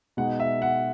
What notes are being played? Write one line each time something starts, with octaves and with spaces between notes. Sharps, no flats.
B2 G#3 D#4 F#5
E5
F#5